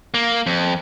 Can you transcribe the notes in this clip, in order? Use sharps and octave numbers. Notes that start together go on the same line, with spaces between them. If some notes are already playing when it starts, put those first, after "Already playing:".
A#3
F2